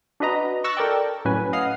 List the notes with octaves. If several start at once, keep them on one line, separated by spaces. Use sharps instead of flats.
D4 F#4 B4 D#5 A#5
C#6 E6 F#6 A6 A#6
A4 A#4 D5 G5
A2 F#3 C#4 B4 G#5
D#5 F5 F#5 D#6 F6 C7